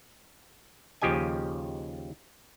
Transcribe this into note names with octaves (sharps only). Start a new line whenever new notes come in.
D#2 C#3 F3 G4 D#5 G#5